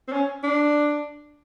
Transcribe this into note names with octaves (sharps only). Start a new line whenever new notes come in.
C4
C#4
D4